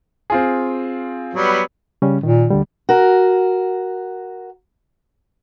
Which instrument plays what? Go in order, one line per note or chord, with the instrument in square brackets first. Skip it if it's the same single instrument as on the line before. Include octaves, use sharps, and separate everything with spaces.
[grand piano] C4 F4 G#4
[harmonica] F#3 G3 B3
[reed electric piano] C#3 G3 C#4
[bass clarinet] A#2 [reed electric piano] D#3
[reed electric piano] D2 D3 G3
[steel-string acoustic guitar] F#4 A#4